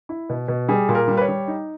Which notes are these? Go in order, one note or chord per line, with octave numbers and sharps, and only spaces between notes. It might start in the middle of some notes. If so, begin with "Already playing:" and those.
E4
B2
B2
G3 G#4
A#2
A#4
G3
B4
C#5
G3
D#4